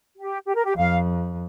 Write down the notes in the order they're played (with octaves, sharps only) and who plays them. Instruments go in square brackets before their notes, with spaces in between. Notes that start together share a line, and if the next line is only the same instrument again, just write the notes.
[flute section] G4
G4
A#4
G4
[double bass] F2 [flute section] F5